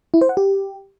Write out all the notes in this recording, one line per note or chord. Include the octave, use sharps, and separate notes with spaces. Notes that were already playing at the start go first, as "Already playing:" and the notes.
E4
C5
F#5
G4